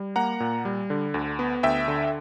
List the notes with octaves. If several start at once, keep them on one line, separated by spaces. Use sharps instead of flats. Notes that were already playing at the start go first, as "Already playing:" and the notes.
Already playing: G3
A#3 F#5 A#5
A#2
G3
D3
D2
B3
D2 E5 G5
D3